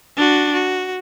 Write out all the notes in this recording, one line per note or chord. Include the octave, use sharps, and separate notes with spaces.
D4 F#4
F#4